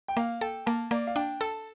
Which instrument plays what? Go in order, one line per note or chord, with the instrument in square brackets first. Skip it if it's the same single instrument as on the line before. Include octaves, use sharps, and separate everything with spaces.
[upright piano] G5
[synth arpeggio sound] A#3 [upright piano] F5
[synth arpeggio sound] A4 [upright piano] G5
[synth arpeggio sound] A#3 [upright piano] A5
[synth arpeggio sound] A#3 [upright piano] D5
[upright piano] F5
[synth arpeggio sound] D4 [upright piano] G5
[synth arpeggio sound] A4 [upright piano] A5